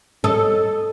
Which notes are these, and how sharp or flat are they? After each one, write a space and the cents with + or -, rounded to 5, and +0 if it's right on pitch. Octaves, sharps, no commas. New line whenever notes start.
A4 +0 D#5 -10